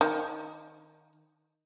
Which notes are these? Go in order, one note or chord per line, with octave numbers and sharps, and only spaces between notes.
D#3